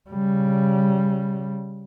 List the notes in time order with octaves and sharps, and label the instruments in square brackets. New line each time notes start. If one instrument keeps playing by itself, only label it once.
[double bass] C#3 G3